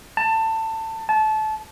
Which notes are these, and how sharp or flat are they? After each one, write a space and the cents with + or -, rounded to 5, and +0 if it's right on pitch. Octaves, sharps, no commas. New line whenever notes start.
A5 +20
A5 -25